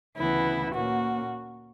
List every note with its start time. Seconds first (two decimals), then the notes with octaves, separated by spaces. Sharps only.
0.16 D2 C#3 E3 B3 E4
0.74 A#2 A#3 C#4 F#4